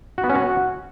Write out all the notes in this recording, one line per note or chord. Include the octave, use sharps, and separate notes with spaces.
F#4
B3
C#4
F#4